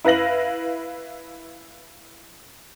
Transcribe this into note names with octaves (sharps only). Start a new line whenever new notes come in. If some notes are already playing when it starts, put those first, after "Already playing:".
E4 B4 F5 A#6 F#7